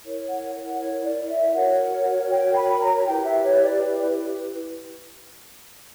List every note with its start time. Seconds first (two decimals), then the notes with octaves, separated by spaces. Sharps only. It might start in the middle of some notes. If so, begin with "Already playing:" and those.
0.04 E4 A#4 C#5
0.29 F#5
0.54 F#5
0.80 C#5
1.04 D5
1.25 D5
1.29 E5
1.54 F#4 A#4 C#5 F#5
2.30 G5
2.55 B5
2.81 A#5
2.97 A#5
3.06 E4 G4 B4 G5
3.24 E5
3.43 C#5
3.62 D5